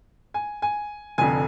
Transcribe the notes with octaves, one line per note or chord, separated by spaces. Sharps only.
G#5
G#5
F1 F2 D3 G#5